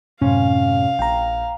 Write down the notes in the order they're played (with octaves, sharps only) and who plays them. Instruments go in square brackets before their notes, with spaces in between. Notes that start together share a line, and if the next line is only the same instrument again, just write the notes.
[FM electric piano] F#2 A2 [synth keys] C3 C#4 [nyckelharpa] F5
[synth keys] A#1 [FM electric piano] G5 A#5